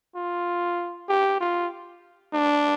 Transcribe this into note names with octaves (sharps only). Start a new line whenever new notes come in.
F4
G4
F4
D4